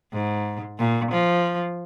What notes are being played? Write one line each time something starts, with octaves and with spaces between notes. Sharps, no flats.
G#2
A#2
F3